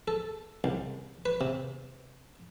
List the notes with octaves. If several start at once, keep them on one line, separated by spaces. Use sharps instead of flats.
A4
C2
B4
C3